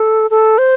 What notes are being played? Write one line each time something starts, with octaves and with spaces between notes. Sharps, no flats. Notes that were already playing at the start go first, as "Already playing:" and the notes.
Already playing: A4
A4
C5